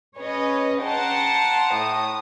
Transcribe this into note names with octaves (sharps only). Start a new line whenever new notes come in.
C#4 G#4 B4 C#5 D#5
F#5 G5 A5 A#5 C6
A2 D#6